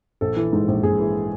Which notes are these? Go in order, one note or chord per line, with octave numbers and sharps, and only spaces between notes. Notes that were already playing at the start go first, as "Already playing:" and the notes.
A#1 A4
E3
G#2
A#1
A#1 G#4
E3